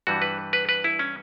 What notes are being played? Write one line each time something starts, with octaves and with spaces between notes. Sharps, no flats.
G2 E3 G3 F#4
B4
B4
B4
E4
C#4